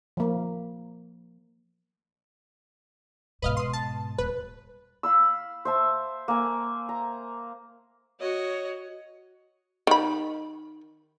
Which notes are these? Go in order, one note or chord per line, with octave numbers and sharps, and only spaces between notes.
F3 A#3
G#2 B2 B4 D#5 F5
C6 D#6
A5
D#1 B4
F5 B5 E6
C5 E5 A5
A#3 G#5
A#5
F#4 C#5 D#5
D#3 B5